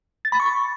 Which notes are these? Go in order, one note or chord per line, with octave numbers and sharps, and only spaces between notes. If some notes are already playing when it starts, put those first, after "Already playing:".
A6
B5
C#6